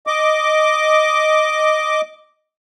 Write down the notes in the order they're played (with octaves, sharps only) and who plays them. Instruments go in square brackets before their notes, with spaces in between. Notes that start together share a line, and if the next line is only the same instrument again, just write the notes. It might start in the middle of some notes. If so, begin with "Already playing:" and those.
[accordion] D#5 D6